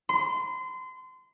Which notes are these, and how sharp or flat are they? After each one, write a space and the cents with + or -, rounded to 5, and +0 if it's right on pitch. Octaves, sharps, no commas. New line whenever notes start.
C6 -30